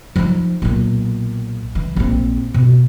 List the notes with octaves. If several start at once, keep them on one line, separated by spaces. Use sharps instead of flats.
F3 D#4
B1 A#2
E3
A#1 C4
B2